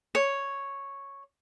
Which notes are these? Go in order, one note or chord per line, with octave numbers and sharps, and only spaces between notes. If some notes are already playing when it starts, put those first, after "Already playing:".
C#5